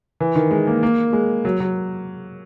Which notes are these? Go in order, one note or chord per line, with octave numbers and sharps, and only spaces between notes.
E3
D#3
G#3
A#3
A#3
G#3
F#3
F#3